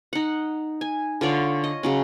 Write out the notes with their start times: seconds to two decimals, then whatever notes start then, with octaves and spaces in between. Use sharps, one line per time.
0.13 D#4 F#5
0.81 G#5
1.21 D3 F4 C#5 D5
1.64 D#5
1.83 C#3 F#3 C#4